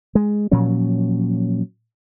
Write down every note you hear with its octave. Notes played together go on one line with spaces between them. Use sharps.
G#3
A#2 F3 F#3 C#4